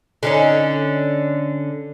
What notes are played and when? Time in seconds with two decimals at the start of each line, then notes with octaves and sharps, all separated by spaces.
0.23 D3 C#4 D#4